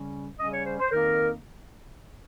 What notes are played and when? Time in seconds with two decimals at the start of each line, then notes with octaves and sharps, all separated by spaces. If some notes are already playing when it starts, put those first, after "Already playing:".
Already playing: C#3 G3 C#4
0.39 C#3 G3 C#4 D#5
0.52 C#5
0.65 C5
0.79 C5
0.91 F2 D#3 A#3 D#4 A#4